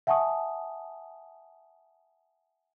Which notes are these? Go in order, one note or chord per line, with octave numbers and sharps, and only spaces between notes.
E5 F#5 G#5 A5 C#6 D#6